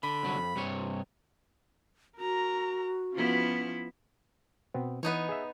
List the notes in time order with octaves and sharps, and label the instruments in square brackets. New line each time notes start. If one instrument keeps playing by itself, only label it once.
[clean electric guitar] D3 [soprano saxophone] B5
[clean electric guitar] C2 D3 F#3
F2
G2 C3 C#5
[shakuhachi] F#4 [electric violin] A#4 A#5
[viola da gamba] F3 B3 E4 [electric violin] C#4 F4
[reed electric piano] B2 B3 C4
[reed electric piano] E3 [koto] B3 D#4 C#5
[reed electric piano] G#4 E5